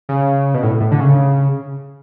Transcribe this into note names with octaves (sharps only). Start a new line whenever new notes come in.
C#3
B2
A2
A2
D3
C#3